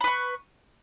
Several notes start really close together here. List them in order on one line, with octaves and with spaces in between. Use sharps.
B5 B4 C#6